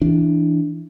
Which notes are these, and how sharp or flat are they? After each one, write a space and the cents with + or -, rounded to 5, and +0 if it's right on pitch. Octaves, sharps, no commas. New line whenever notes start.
E3 +0 D4 +0